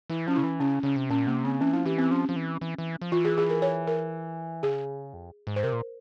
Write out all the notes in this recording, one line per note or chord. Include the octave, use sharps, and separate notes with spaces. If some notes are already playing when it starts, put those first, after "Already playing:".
E3 E4
F3 C#4
C#3 E4
E3
C#3 C#4
C#3 C#4
C3
A#2 C#4
C3 A#3
C#3 C4
E3 C#4
F3 E4
E3 G4
C4
F3 C#4
F3
E3
E3
E3
F3
E3 F4
G#4
G#4
A#4
C#5
A#4
C#3 G#4
F2
G#2
C5
C3 A#4
A#2